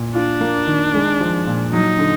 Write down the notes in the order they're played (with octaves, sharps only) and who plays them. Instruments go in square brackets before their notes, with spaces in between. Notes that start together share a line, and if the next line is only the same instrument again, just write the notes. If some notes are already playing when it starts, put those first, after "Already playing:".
Already playing: [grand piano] A#2
[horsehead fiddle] D4 [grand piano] F4
[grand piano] A#3
D#3
G#3
F3
A#2
[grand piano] F#3 [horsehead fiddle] D#4
[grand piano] D3